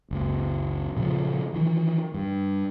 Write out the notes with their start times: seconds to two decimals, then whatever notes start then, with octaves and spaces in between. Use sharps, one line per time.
0.11 F#1 C#2
0.97 A#2 C#3 E3 F3
1.54 D#3 E3
2.14 G2